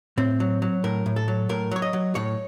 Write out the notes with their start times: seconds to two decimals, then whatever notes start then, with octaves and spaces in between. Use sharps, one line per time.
0.17 A2 C4
0.40 F#3
0.62 F#3
0.84 A2 A#4
1.06 A2
1.16 A4
1.28 F#3
1.49 A2 A#4
1.71 F#3 C#5
1.82 D#5
1.93 F#3
2.15 A2 C#5